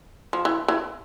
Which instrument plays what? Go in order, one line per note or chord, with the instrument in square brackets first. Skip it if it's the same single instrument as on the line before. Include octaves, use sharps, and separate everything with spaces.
[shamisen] F3
E3
E3